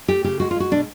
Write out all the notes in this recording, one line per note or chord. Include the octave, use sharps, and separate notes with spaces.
A3 G4
C#3 G4
G#3 F#4
F4
G#3 F#4
B2 D4